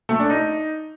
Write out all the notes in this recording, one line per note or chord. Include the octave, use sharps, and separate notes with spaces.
A3
D4
D#4